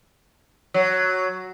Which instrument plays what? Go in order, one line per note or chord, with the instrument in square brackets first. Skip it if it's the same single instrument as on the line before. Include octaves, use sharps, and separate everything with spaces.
[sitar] F#3